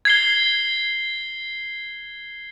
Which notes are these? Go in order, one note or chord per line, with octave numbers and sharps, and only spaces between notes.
G#6 C7 G7